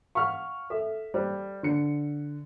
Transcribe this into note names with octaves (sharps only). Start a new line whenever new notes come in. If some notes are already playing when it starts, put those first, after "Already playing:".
F5 F#5 C#6 F6
A4 E5
G3 C5
D3 C#7